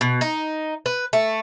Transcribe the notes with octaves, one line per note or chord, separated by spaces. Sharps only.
B2
D#4
B4
A3